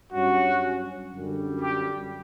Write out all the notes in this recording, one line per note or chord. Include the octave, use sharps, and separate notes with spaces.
G2 F#3 C#4 F#4
F#2 D3 G3
G4